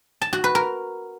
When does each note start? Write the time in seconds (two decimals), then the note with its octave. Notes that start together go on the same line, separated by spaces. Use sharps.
0.22 A5
0.33 F#4
0.44 B4
0.55 A#4